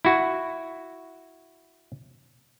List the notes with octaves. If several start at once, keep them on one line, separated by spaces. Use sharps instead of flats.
E4 F#4